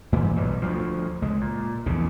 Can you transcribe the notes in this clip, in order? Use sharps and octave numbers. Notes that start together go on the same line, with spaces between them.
G2 A#2 E3 G3
B1 F#3 G3
D2 F3
C#2 G#3
A#2
A#1 E2 C#3